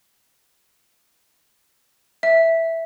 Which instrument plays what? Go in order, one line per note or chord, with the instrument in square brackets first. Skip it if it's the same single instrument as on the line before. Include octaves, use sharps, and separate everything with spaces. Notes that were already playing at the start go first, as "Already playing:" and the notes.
[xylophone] E5